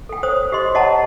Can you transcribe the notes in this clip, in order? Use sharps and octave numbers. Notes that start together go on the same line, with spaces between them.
A4 G5
C5 C#5 D#6
G4 D#5 C6
C#5 D#5 F#5 A5 A#5